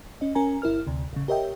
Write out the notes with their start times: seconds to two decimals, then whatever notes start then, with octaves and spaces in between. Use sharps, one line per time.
0.21 C#4 D#5
0.35 C#4 A#4 G#5 A#5
0.62 G1 E4 A#4 F6
0.87 D2 C3
1.13 A1 C#3
1.28 G4 A#4 C#5 D#5 E5 G5